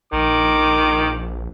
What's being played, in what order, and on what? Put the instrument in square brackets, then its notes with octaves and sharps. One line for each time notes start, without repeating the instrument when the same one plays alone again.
[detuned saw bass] A#1 [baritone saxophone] D#3 [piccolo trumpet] D6